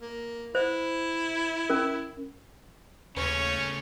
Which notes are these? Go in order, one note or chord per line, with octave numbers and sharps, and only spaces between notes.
A#3
E4 C5
C#4 A#4
D#2 C#3 A3 C#4 C#5